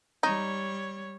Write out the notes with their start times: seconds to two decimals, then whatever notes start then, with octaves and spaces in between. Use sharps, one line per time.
0.23 G3 D#4 C#5